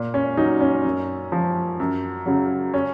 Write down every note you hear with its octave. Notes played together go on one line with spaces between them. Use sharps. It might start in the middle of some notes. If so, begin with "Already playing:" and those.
Already playing: A#2
C#4
F#3 D#4
C#4
F#2
F3
F#2
C#3 F#3
C#4